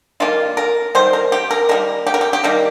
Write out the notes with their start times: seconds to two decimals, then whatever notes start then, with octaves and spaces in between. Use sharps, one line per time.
0.20 D#3 G3 A#3 F4
0.57 A#4
0.95 D#3 G3 C5
1.13 A#4
1.32 G4
1.51 A#4
1.69 D#3 G3 A#3 A#4
2.06 G4
2.14 A#4
2.21 G4
2.33 G4
2.44 D#3 G3 A#3 A#4